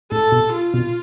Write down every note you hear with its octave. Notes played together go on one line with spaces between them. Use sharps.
A2 A4
B2
F4
B2